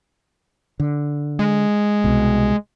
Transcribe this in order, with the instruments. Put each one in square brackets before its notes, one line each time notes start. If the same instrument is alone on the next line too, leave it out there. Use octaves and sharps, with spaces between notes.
[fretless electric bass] D3
[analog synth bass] G#3
[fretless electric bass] C2 B2